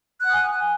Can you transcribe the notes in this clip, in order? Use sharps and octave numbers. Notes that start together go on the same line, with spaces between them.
F#5 G#5 D#6 F#6